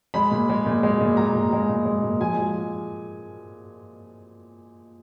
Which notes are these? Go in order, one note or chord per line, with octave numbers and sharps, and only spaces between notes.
G#3 B5
A#2
G#3
A#2
G#3
A#2
G#3 A#5
A#2
G#3
A#2
G#3
A#2
F3 G#5
G#3